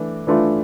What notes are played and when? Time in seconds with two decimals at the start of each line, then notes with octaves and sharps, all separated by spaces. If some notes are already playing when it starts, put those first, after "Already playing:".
Already playing: E3 A3 D4
0.27 E3 A3 D4 F4